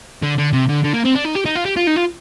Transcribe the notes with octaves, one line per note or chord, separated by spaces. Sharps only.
D3
D3
C3
D3
D3
A#3
C4
D4
D#4
G4
D#4
F4
G4
F4
D#4
F4